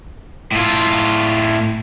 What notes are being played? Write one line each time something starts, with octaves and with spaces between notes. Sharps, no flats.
A2 F4